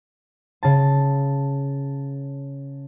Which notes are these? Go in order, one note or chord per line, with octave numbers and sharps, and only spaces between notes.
C#3 A5